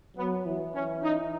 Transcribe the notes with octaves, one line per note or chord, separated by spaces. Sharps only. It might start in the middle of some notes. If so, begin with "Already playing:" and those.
F#3 B3
E3
C#4
D#4